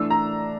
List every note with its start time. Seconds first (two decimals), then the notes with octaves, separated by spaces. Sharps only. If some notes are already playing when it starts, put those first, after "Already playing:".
Already playing: E3 A3 D4 E6
0.10 A#5